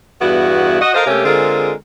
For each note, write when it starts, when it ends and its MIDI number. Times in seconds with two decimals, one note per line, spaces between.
0.21 0.81 40
0.21 0.81 43
0.21 0.81 59
0.21 0.81 64
0.21 0.81 66
0.81 0.91 66
0.81 0.91 75
0.94 1.05 69
0.94 1.05 70
0.94 1.05 72
0.94 1.05 75
0.94 1.05 77
1.06 1.22 48
1.06 1.22 57
1.06 1.22 58
1.06 1.22 61
1.06 1.22 67
1.25 1.71 50
1.25 1.71 56
1.25 1.71 60
1.25 1.71 65
1.25 1.71 68
1.25 1.71 70